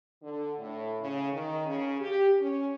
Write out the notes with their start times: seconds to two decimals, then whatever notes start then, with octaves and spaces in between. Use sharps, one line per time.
0.23 D3
0.59 A2
1.01 C#3
1.32 D#3
1.65 C#3
2.00 G4
2.39 C#4